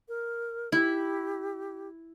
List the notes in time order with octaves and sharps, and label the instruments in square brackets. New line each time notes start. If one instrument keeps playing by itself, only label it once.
[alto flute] A#4
[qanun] E4 [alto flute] G4